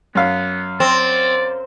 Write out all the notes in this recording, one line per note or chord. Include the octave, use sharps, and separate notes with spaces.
F#2 B3 F5
C4 D5